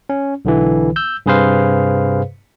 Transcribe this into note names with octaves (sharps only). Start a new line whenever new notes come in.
C#4
B1 D3 E3
E6 G6
G2 C3 G#4 B4 C5 F5